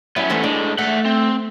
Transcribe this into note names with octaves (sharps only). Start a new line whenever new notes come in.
F#3 G3 B3 C#4 E4
E3 A3 C5
A2 G#3 D4
A3 E5 F#5
C4